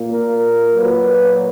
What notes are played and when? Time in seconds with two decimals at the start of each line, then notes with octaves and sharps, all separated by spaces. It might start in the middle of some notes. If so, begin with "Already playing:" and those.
Already playing: A#2 A#3
0.12 A#4
0.74 A#2 F#3 A#3 B4